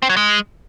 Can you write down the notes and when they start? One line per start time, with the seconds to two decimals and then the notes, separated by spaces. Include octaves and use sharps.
0.02 C4
0.10 F#3
0.17 G#3